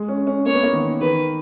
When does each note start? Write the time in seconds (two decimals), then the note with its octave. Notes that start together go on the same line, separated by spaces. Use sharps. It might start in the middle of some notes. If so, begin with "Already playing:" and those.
Already playing: G#3
0.08 C#4
0.27 C#4
0.46 A#3 C#5
0.55 B3
0.63 A#3
0.73 D#3
1.01 D#3 B4